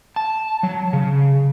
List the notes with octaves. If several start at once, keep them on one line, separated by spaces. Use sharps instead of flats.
A5
F#3
C#3